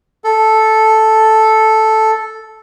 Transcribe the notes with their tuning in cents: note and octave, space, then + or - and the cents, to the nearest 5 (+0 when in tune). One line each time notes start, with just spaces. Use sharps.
A4 -5